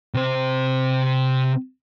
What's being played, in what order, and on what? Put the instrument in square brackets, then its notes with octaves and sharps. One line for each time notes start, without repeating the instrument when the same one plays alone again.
[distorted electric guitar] C3 C5